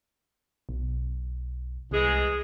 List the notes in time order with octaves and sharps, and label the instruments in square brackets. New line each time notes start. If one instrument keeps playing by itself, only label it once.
[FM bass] B1
[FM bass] C2 [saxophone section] E3 G#3 G#4